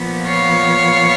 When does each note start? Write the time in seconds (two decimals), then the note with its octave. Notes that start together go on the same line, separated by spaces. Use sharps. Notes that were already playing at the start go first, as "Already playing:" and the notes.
Already playing: A#2 F3 B3
0.27 C#5 F5